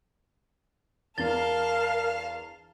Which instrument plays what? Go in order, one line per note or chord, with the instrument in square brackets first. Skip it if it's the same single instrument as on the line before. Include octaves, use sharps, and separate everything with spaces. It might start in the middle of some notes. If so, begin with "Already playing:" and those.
[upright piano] E2 D4 [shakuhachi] A#4 [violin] F5 A5 [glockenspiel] A6 G7